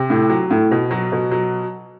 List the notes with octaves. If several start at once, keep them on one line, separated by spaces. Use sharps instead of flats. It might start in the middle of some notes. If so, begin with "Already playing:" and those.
Already playing: C3
A2
F#3
A2
B2
F#3
B2
F#3